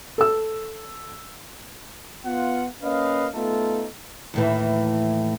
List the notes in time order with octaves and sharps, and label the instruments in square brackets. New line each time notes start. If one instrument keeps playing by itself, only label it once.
[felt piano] A4 E6
[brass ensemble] B3 F4 F#5
A#3 C#4 B4 D#5 F5
A3 B3 D#4 F4 A4
[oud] D#2 A2 E3